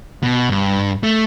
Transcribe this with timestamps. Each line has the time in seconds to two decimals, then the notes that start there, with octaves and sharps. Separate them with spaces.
0.23 B2
0.50 G2
1.03 A3